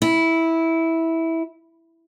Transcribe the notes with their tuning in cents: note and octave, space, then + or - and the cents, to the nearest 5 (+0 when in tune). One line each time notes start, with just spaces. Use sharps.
E4 -10